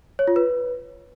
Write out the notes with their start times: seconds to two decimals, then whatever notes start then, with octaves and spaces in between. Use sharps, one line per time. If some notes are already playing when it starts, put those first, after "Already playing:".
0.19 C#5
0.28 F4
0.36 B4